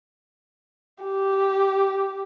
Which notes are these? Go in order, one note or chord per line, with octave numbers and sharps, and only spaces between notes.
G4